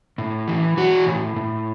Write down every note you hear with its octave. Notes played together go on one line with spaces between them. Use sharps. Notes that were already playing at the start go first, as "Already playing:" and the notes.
A2
E3
E3 F#4
A2
A2